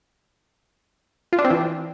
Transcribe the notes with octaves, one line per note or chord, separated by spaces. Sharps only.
F4
D4
C4
E3